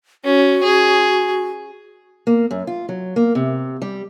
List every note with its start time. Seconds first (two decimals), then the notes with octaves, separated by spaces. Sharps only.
0.25 C#4 F#4
0.63 G#4
2.27 A#3
2.51 F#2
2.67 F4
2.89 F#3
3.16 A#3
3.35 C3
3.82 G3